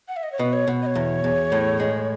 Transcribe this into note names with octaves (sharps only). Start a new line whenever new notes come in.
F#5
E5
D#5
C#5
B2 B4
C#5
B2
D#5
C#5
E2
E2
A2
G#3